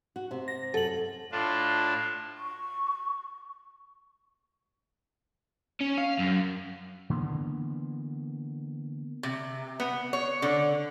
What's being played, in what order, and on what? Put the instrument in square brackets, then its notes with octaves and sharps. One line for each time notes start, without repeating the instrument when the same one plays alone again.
[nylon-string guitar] F#4
C3
[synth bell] A#6
[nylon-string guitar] F#2 [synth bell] A4 F#7
[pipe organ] A2 D4 F4
[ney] C#6
[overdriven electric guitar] C#4
F5
F#2
[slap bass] D3 E3 A#3 B3
[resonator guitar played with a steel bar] C3
B3
C#5
D3